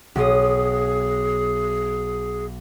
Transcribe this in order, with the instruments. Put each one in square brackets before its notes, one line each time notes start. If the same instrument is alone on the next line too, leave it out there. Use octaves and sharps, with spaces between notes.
[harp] B1 D#6 [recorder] G#4